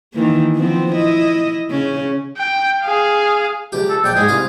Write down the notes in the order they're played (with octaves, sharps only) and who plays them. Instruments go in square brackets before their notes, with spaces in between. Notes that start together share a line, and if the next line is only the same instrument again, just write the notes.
[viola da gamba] D#3 E3 A#3
F3 B3 C4
E4 D#5
C#3 C#4
[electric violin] G5
G#4 F5
[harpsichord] C#2 G4
[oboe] A4
[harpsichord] A#1 D5 [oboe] G5
[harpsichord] G#2 G#3 [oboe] G#4
[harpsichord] C2 F4 F5